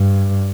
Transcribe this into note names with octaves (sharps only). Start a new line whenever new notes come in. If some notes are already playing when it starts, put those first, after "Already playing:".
Already playing: G2